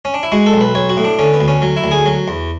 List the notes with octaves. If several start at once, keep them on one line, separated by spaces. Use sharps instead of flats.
C#4
D4
E4
G#3 F#4
A4
B1
B4
B1 C#5
F#4
A2
D4
D3 C#4
B3
D2
C#4
F#3
E4
D2
G#4
F#3
E2